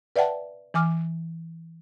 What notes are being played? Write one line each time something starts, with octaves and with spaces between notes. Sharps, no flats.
B4 D5 E5 F#5 G5 A5
E3 G#5 D6 F6